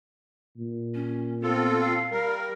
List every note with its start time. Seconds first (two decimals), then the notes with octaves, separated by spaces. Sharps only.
0.57 A#2
0.94 C#4
1.43 B3 C4 F4 A4
1.80 F5
2.11 G3 A#4